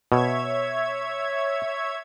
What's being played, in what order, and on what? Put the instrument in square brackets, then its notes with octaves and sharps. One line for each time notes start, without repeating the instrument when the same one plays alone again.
[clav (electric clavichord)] B2 [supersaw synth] C#5 E5 G#6